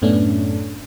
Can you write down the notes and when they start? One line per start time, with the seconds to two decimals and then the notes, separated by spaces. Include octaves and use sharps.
0.02 F#2 A2 A3 B3 C#4 D4